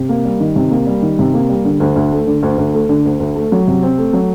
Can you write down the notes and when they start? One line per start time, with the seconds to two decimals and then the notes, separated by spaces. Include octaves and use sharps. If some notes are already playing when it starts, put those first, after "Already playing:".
Already playing: C3
0.09 A#3
0.25 G3
0.40 D#3
0.56 C3
0.71 A#3
0.87 G3
1.02 D#3
1.19 C3
1.34 A#3
1.49 G3
1.65 D3
1.80 D2
1.96 D2
2.12 A3
2.27 D3
2.43 D2
2.58 D2
2.74 A3
2.89 D3
3.05 D2
3.20 D2
3.36 A3
3.52 F#3
3.67 C3
3.83 C4
3.98 A3
4.13 F#3